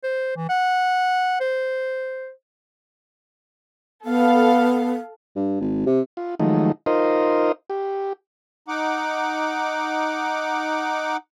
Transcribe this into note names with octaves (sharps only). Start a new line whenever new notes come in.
C5
E3
F#5
C5
B3 A4 F5
G2
G#1
C3
F4
D#3 F3 F#3 G#3 A3 D#4
D#4 F4 A#4 C5 D#5
G4
D#4 F#5 D6